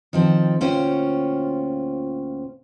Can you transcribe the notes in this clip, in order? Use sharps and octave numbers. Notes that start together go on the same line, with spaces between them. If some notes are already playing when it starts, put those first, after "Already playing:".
D#3 F3 C4 A4
D2 A#2 C#4 F4 C5 G5